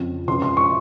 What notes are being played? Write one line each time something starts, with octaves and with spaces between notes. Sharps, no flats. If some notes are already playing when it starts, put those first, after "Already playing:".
Already playing: F2 C#3 F3
C#2 C#3 F3 C6
C6
C#6